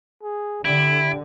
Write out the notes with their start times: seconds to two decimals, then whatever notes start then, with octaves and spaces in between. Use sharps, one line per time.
0.23 G#4
0.65 D3 E4 G4 D7